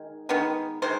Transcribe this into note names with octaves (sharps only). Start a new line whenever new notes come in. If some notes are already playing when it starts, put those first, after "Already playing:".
Already playing: D#3 G#3
D#3 G#3 B3
D#3 G#3 C5